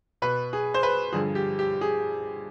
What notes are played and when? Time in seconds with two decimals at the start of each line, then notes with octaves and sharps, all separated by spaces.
0.22 B2 B4
0.53 G#4
0.74 C5
0.83 B4
1.12 G2 D3 F3 G#4
1.35 G4
1.59 G4
1.81 G#4